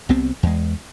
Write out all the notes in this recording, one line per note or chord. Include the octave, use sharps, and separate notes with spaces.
C2 C3 B3 C4
E2 G#3